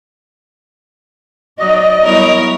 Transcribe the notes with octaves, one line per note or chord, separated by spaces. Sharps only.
F#3 D#4 D5 D#5
F#3 G3 B3 E4 A#4 C#5